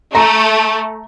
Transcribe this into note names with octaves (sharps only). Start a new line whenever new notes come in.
A3 A#5